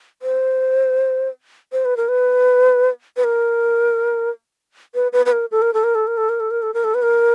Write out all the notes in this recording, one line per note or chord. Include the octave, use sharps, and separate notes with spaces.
C5
C5
B4
A#4
B4
B4
A#4
B4
B4
B4
A#4
A4
A#4
A4
A#4
A4
A#4
A4
A#4
A4
A#4
A4
A#4
A4
B4
A#4